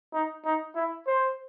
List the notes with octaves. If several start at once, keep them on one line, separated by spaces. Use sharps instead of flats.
D#4
D#4
E4
C5